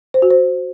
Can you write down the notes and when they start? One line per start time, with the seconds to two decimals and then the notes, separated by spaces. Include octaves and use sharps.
0.14 C5
0.22 F#4
0.31 C5